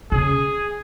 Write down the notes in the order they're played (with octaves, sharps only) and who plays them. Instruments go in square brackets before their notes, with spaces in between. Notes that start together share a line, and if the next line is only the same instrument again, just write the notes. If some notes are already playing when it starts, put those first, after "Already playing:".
[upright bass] C#3 [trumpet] G#4